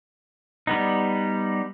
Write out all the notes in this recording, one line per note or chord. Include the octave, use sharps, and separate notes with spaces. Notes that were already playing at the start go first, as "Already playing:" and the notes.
G3 B3 D#4